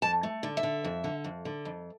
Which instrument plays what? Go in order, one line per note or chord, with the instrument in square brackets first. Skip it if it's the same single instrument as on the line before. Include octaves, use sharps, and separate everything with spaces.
[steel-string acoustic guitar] F2 A5
A3
D3
E5
D3
F2
D3
F2
D3
F2